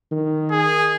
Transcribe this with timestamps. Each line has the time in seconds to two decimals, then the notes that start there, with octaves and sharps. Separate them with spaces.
0.11 D#3
0.51 G#4